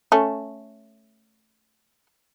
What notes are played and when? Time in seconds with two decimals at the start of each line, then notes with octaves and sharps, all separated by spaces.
0.12 A3 C#4